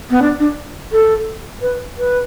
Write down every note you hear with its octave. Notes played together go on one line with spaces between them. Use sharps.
B3
D4
D4
A4
B4
B4